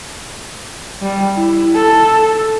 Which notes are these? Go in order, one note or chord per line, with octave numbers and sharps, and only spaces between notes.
G3
E4
A4